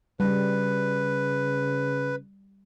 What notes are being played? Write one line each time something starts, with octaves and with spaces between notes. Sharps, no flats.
C#3 G3 B4